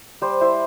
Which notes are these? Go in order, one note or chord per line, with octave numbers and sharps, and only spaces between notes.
G3 C5
E4 C5